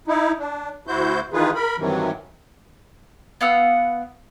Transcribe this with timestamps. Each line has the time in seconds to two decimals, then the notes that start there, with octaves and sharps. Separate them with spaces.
0.08 D#4 E4
0.38 D4
0.87 D2 E4 F#4 C5 G6
1.33 D#3 E3 D#4 F4 G#4 B4
1.55 A#4 B5
1.78 G2 C3 D#3 E3 F#3
3.41 B3 F5 F#5 E6